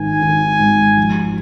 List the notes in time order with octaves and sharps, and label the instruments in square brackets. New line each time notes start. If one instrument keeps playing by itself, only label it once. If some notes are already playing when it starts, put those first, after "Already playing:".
Already playing: [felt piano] G#1 D#3 [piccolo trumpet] G#5
[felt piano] D#3
G#1
F3